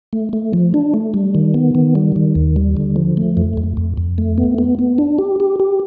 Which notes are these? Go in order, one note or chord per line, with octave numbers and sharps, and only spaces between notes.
A3
A3
F3
D4
A3
G3
D#3
B3
D#3
G3
D#3
D#2
G3
D3
F3
A3
F2
F2
F2
F2
A3
B3
B3
B3
D4
G4
G4
G4